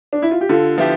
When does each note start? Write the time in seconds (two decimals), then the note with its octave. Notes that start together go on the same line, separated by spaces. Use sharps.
0.13 D4
0.22 E4
0.31 F4
0.41 G4
0.49 D3 F4 A4
0.78 F3 B3 E4 G4